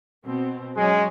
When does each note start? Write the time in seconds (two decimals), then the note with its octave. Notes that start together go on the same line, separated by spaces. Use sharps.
0.25 B2 C4
0.76 F#2 F#3 G#3 C#4